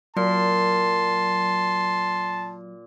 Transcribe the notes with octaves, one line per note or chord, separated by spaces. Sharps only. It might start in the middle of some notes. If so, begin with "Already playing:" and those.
A#2 F#3 A5 C6